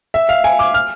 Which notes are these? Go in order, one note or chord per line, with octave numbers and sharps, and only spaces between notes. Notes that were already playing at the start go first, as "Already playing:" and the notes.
E5
F5
G#5
D6
F6